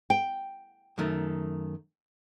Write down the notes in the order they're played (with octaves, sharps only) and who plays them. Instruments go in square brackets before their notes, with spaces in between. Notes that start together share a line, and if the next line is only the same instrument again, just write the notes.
[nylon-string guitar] G5
[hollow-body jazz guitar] F#2 D#3 A3